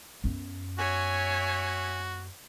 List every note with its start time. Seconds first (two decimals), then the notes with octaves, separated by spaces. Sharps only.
0.24 F#2 B3
0.78 F#4 C#5 E5 G#5